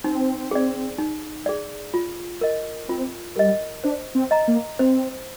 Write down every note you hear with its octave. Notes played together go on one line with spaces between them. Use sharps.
C4 D#4
G#4 D5
D#4
G#4 D5
F4
A#4 D#5
C4 F4
G3 A#4 D#5
D4 C5
C4
D#5 A#5
A#3
C4 C5